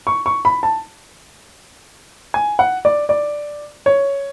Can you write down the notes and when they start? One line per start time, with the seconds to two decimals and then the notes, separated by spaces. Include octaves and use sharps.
0.07 C#6
0.26 C#6
0.45 B5
0.63 A5
2.34 G#5
2.59 F#5
2.85 D5
3.09 D5
3.86 C#5